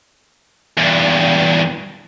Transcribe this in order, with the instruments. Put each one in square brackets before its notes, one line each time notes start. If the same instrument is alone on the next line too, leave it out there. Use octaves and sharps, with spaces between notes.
[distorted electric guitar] E2 G2